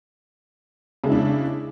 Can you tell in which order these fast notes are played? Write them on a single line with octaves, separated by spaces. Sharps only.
C#3 G#3 E4 D4